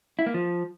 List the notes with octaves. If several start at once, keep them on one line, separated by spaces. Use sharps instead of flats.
E4
A#3
F3